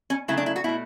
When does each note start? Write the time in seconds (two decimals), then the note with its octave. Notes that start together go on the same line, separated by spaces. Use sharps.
0.10 C#4
0.28 C#3 F#3 A3 E4
0.37 D4
0.46 E4
0.56 F#4
0.64 B2 A3 E4